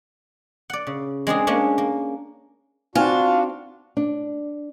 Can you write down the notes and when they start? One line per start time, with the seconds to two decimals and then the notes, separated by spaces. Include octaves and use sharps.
0.70 D5 F#5
0.87 C#3
1.27 G#3 C4 D4 G#4
1.47 G#3 A#3 C#4 D4
1.78 A#3
2.96 C4 D4 D#4 F4 F#4
3.97 D4